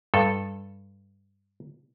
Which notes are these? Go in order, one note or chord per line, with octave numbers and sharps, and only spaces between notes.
G2 A4